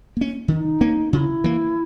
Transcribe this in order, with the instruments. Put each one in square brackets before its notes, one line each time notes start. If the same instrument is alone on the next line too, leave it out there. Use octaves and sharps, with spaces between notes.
[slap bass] A#3 C#4
[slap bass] D#3 [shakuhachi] D#4
[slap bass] A#3 C#4
[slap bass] C#3 [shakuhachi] E4 F#4
[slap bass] E3 A#3